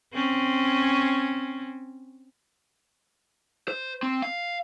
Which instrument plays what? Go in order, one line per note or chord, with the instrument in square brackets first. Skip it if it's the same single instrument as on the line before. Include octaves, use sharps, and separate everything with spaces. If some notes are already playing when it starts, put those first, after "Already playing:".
[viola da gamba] C4 C#4
[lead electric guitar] C5
C4
F5